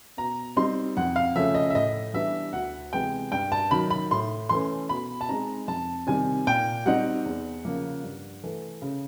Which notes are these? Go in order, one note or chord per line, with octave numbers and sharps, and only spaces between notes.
B2 A#5
G3 C4 D#4 C6
F2 F#5
F5
C#3 F3 A3 C#4 E5
D#5
E5
A2 D#5
E3 G3 B3 D4 E5
D2 F#5
C3 E3 G#3 B3 G5
G2 G5
A5
D#3 F#3 B5
B5
A2 C6
E3 A3 C#4 C6
B2 B5
A5
G#3 C4 D#4 A#5
F2 A5
C3 D#3 G3 C4 G#5
A#2 G5
G3 C4 D#4 F#5
E2
C#3 F3 A#3
G2
E3 A3
C#3